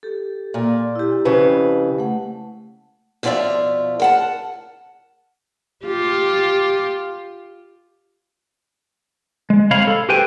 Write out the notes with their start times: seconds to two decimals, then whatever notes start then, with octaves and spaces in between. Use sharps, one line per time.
0.03 G4 A4
0.54 A#2 D5 C6
0.96 E4 G4
1.25 F2 C#3 B4
1.98 A3 F#5
3.23 F2 B2 C#4 F4 D5 E5
4.00 A#4 F#5 A5
5.86 F4 G4
9.50 G#3
9.71 C3 G#3 C#5 F5 B5
9.87 A4
10.09 G4 A4 B4 C5 G5 G#5